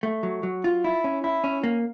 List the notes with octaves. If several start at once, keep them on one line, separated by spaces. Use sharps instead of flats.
A3
F#3
F#3
F4
E4
C#4
E4
C#4
A#3